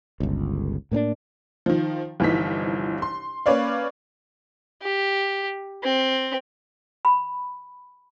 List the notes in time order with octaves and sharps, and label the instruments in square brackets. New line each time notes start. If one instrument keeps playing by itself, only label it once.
[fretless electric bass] G1 C#2
A2 A#3 C4 D4
[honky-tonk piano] D#3 F3
G1 C2 E3 F3 D#4 B6
C6
A#3 C#4 B4 C#5 D5 F5
[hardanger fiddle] G4
C4
[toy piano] B5